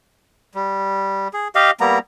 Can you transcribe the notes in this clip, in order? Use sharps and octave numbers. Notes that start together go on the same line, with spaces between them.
G3
G#4
G4 D#5 F5
G3 A#3 B3 A#5